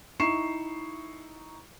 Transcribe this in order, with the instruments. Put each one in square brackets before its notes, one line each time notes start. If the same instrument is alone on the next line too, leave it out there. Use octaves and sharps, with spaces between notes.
[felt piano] D#4 E4 C#6 C7 E7